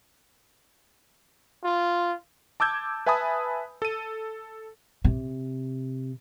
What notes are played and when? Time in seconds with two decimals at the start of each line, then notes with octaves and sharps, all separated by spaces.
1.64 F4
2.60 A5 D6 E6 G6 G#6
3.06 B4 E5 G#5 A5 B5 D#6
3.82 A4 D#7
5.04 C3